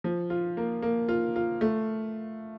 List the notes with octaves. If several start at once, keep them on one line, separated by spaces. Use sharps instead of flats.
F3
F4
A#3
A#3
F4
F4
A3